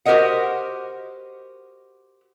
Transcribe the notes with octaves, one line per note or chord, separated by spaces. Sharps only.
F#4 G4 A#4 C5 D#5 F#5